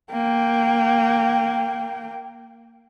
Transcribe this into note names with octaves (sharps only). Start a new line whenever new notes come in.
A#3 G5